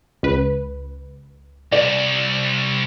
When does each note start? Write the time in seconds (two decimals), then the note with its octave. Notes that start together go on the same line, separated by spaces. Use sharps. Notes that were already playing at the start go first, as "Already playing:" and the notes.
0.23 C#2 B4
1.72 C2 D5